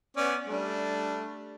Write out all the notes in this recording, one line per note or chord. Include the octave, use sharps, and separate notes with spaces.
B3 C#4 D5
G3 A3 D4